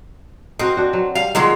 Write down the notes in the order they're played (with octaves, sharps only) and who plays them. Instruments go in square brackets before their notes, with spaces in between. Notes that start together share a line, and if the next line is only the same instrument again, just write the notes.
[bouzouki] C4 [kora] F#4 A#4 D#5
[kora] D4 F#4
F#3
[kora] G3 [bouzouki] F5
[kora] D#3 A#3 [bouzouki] F#3 G#3 F4